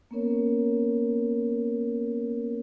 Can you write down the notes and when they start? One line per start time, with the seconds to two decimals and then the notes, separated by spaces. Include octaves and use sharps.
0.11 A#3 B3 C#4 A#4 C#5